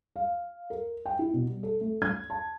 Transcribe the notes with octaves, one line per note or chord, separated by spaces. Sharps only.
F5
A#4
G5
E4
B2
G3
A4
A3
G#6
A5